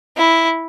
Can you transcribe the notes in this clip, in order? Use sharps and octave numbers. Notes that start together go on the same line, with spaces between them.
E4